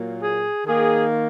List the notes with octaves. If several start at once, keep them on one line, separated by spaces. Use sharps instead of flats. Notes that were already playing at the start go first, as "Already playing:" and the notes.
Already playing: A#2 F#3 A#3
G#4
D#3 A#3 G#4